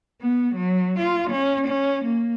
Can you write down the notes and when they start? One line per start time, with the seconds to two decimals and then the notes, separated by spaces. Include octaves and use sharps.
0.22 B3
0.55 F#3
0.99 F4
1.31 C#4
1.67 C#4
2.05 A#3